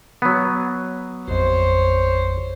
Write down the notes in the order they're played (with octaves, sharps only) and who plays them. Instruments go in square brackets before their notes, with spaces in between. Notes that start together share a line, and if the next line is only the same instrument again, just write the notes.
[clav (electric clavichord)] F#3 B3
[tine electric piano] A1 F2 [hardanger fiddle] C5 C#5